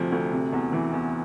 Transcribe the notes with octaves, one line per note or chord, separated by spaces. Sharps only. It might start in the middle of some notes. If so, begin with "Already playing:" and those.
Already playing: D2 C3 F3
D2
C3
E2
E3
E2